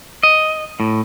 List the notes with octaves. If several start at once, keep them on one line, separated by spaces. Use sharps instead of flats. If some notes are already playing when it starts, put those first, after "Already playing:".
D#5
A2